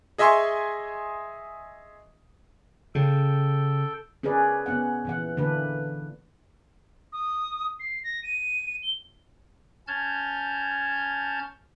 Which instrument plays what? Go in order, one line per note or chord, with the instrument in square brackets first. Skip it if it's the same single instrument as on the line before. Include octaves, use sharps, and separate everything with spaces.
[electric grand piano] G#4 D#5 E5 G#5 C6 C#6
[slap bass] C#3 [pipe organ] A4 G5
[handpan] C#4 G#4 A#4 B4 D5
B3 C#4 F#5
A#2 E3 F#5
D3 E3 A#3 D4 B4
[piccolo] D#6
C7
A#6
D#7
G7
[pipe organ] C#4 A5 F6 G6 G#6